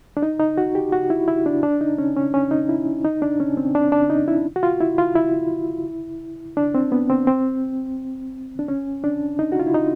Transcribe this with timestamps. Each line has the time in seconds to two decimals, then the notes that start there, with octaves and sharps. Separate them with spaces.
0.17 D4
0.22 D#4
0.40 D#4
0.58 F#4
0.75 G4
0.92 F#4
1.10 E4
1.28 E4
1.46 D4
1.63 D4
1.81 D#4
1.98 C#4
2.16 C#4
2.34 C#4
2.51 D#4
2.69 E4
3.04 D#4
3.22 D4
3.40 C#4
3.57 C4
3.75 D4
3.92 D4
4.10 D#4
4.28 E4
4.56 F#4
4.63 F4
4.80 E4
4.98 F4
5.16 E4
6.57 D4
6.75 C4
6.92 B3
7.10 C4
7.27 C4
8.59 D4
8.68 C#4
9.04 D4
9.39 D#4
9.52 F#4
9.60 F4
9.67 E4
9.74 D#4